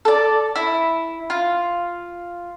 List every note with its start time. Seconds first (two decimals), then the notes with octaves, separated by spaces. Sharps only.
0.05 A4 D5
0.56 E4
1.30 F4